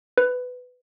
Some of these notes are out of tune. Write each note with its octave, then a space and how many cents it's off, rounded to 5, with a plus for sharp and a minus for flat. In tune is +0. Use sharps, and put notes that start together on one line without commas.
B4 +15